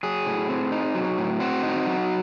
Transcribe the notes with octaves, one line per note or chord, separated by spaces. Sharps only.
F#3 G#4
A2
C4
D#4
F#3
A2
C4 F#4
D#4
F#3